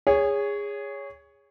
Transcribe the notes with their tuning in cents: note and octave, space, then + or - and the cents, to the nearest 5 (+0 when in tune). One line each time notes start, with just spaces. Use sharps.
G#4 -20 C#5 +10